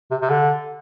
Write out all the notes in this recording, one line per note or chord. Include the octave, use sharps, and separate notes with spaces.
C3
C3
D3